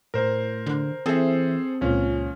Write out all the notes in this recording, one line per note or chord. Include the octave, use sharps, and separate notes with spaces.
A2 A#4 C5
D3
E3 C4 G#4 A4 C5 E5
C#2 A#2 F3 C#4